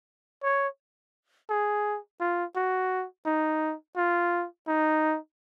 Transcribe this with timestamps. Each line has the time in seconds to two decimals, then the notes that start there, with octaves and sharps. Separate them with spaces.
0.43 C#5
1.50 G#4
2.20 F4
2.56 F#4
3.26 D#4
3.97 F4
4.68 D#4